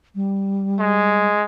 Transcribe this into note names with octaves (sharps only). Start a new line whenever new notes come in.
G3
G#3